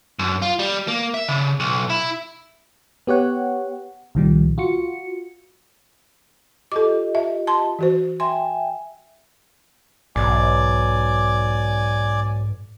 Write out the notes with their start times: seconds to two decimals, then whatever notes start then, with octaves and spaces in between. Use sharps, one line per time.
0.19 F#2
0.42 F4
0.59 G3
0.88 A#3
1.14 E5
1.28 C#3
1.60 B1
1.90 E4
3.07 B3 G4 C#5 F#5
4.15 C2 A#2 D#3 F3 G3
4.58 F4 F#4 C#7
6.72 F4 G4 A4 D#5 D6
7.15 E5
7.47 A5 C6
7.79 E3 F#4 C5
8.20 E5 G5 G#5 C6
10.16 B1 G#2 D5 G#5 D6